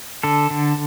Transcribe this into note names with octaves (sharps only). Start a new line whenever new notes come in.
D3 A4
D3